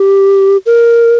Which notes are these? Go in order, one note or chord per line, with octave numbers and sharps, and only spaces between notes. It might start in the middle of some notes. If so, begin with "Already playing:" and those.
Already playing: G4
A#4